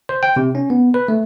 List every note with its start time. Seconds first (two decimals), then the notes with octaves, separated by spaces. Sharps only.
0.09 C5
0.23 G5
0.36 C3
0.55 C#4
0.70 B3
0.94 B4
1.08 A3